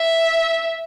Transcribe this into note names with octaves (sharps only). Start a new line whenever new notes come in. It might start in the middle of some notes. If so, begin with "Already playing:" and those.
Already playing: E5